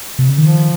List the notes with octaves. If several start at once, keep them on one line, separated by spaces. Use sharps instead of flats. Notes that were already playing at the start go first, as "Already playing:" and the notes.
C3
C#3
D#3 F3